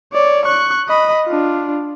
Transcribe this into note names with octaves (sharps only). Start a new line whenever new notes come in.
C#5 D5
C#6 F#6
D#5 B5
D4 F4